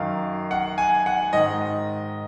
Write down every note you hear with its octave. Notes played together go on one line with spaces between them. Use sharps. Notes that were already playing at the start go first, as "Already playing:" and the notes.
Already playing: F#2 D#3 F5
F#5
G#5
F#5
G#2 D#3 D#5